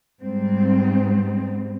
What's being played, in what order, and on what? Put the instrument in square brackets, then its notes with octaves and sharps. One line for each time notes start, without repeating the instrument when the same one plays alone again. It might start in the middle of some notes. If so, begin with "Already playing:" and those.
[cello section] G#2 G3 C4